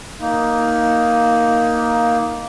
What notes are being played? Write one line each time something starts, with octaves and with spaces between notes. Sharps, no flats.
A#3 D#4